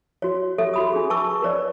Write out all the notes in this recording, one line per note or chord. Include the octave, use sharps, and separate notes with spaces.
F#4 C#5
G4 A4 C#5 E5
F#4 B5 D#6
D4 G#4
B4 A5 C#6 D6 E6
A#4 B4 C#5 D5